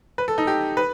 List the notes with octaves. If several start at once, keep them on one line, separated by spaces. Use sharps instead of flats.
B4
A4
D#4
G4
B4